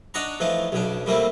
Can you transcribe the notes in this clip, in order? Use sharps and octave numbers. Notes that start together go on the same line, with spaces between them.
D4 D#4 C#5 D5 F#5 A#5
E3 F3 A3 D#4
B1 C#3 D4
G3 A3 A#3 C4 E4